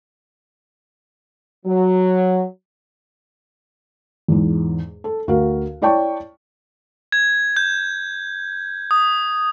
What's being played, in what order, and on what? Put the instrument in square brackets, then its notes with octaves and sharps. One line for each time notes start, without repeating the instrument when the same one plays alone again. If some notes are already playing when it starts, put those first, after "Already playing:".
[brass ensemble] F#3
[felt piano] E2 G#2
A4
D2 F#4 A#4 F5
E4 C#5 D5 G5 A5 C#6
[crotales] G#6
G6
D#6